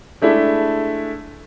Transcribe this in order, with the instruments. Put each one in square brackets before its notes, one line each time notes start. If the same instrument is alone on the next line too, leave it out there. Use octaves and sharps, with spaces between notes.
[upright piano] G#3 A3 D4 E4